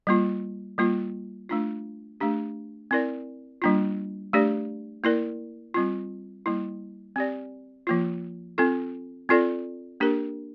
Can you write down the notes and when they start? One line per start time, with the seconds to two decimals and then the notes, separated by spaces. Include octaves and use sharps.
0.07 G3 A#3 F4
0.78 G3 A#3 F4
1.49 A3 D4 F4
2.20 A3 D4 G4
2.91 C4 E4 A#4 D5
3.62 G3 A#3 D4 F4
4.33 A3 D4 G4 D5
5.04 A#3 E4 A#4 D5
5.74 G3 C4 F4
6.46 G3 A#3 E4
7.16 C4 G4 D5
7.87 F3 A#3 F4
8.58 C4 F4 A4
9.29 C4 F4 A4 D5
10.00 A#3 D4 G4 A#4